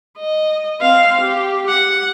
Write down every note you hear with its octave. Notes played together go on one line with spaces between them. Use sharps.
D#5
C4 F5
G4
F#5